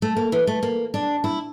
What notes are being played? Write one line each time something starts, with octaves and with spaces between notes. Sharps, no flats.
A3
A#3
E3
A3
A#3
D4
E4